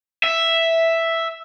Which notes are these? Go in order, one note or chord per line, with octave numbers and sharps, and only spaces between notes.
E5